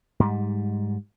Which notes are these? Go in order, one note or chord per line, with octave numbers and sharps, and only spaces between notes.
G#2 G3